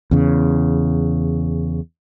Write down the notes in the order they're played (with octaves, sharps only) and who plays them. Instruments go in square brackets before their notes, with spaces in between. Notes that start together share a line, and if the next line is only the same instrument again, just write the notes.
[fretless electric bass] E2 C#3